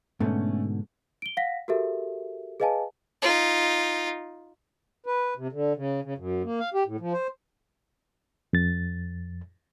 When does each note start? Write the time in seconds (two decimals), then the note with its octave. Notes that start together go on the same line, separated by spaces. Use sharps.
0.20 G#2 B2 D3 A3 C#4
1.22 D7 G7
1.37 F5 F#5 A#6 B6
1.68 F#4 G4 A4 A#4 E5
2.60 G#4 B4 D#5 F5 G#5 A5
3.22 D#4 F4
5.06 B4
5.37 C3
5.52 D3
5.76 C#3
6.04 C#3
6.18 F#2
6.44 A#3
6.60 F5
6.74 G4
6.86 A2
7.00 F3
7.13 C5
8.53 F2 A6